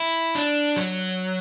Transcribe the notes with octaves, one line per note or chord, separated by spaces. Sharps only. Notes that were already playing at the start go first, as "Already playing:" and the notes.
Already playing: E4
D4
F#3